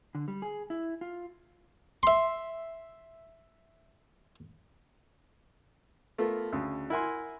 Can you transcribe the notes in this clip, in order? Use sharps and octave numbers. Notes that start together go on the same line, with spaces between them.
D3
G3
G#4
E4
F4
E5 C6
A3 B3 F4 A4 A#4
D2 C#3
E4 A#4 F#5 G#5 C6